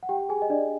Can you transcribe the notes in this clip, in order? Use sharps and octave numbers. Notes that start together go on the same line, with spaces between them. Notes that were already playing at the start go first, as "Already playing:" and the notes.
F#5
G4 G5
G#4 G#5
D#5
D4 D5